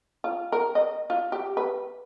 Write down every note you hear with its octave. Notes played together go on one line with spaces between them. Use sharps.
F4
A#4
D#5
F4
G4
B4